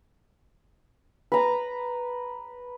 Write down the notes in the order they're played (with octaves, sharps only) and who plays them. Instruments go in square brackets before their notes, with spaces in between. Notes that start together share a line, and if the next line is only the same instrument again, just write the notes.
[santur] B4 A#5